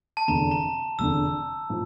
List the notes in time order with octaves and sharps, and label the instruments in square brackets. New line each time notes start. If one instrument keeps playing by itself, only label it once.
[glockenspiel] A5
[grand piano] F1 E2 D3 [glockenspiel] A#5
[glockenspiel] A#5
[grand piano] F1 E2 D3 [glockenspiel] E6
[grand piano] A2 F3